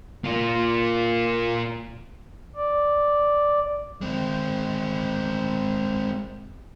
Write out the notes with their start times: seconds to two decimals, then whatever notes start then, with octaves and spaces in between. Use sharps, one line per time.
0.24 A#3 F4
2.55 D5
4.01 G#3 C4